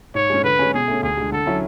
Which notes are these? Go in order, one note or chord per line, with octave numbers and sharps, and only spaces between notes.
G#2 C#5
G#3 C#4
D3 B4
G#3 C#4
B2 G#4
A3 C#4
D2 G#4
D3 G#3
D3 A4
F#3 C#4 E4